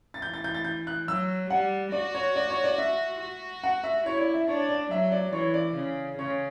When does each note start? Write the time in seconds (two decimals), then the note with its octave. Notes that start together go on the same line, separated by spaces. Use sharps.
0.14 A6
0.22 E3 G6
0.34 A6
0.44 G6
0.54 A6
0.64 G6
0.87 F#6
1.08 F#3 E6
1.50 G3 F#5
1.92 F#4 D5
2.15 C#5
2.36 D5
2.50 C#5
2.64 D5
2.78 E5
3.20 F#4
3.63 F#5
3.84 E5
4.06 E4 C#5
4.19 D5
4.34 E5
4.48 D4 C#5
4.69 D5
4.91 F#3 E5
5.12 D5
5.33 E3 C#5
5.54 D5
5.76 C#3
6.18 C#3 C#5